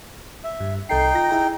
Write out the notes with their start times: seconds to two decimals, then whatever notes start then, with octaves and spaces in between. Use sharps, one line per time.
0.44 E5
0.60 G2
0.89 C2 D#4 A4 G5 C7
1.14 F4 A#6
1.30 E4 G#4 A#5